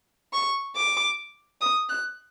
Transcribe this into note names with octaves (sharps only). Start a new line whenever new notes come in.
C#6
D6
D#6
F#6